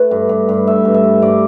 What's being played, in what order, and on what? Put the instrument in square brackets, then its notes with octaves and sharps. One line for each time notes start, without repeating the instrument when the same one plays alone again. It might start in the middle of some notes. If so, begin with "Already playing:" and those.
Already playing: [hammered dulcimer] A3 B4
G2
G2
G2
A3 E5
G2
E5
G2
G2 D5